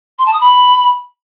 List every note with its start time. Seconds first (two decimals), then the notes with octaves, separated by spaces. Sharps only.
0.18 C6
0.25 A5
0.33 D#6
0.40 B5